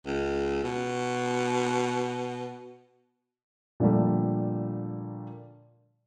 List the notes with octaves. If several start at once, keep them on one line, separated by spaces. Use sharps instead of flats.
C#2
B2
A#2 D3 F3 G3 A3